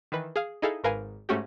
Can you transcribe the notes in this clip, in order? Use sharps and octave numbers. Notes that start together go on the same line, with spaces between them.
D#3 E3 B4
G#4 F5
D#4 E4 G#4 A4 F5
G#1 G#2 A#4 B4 F5 G#5
G#2 A3 C#4 F#4 G4